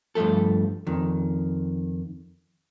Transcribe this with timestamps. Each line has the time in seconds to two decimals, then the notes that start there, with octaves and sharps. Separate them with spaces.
0.15 G2 F3 G#3 A3 A4
0.87 F2 D#3